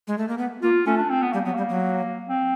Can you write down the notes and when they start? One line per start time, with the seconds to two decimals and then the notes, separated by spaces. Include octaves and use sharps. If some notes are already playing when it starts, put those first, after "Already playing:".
0.07 G#3
0.18 A3
0.28 A#3
0.38 B3
0.62 A#3 F4
0.86 A3 C#4
0.97 D4
1.10 C4
1.22 B3
1.33 G3 A#3
1.45 F#3 B3
1.55 G3 A#3
1.69 F#3
2.29 C4